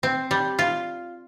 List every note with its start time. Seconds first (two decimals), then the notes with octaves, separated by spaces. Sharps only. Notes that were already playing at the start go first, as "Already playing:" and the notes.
0.03 C4
0.31 G3
0.59 F4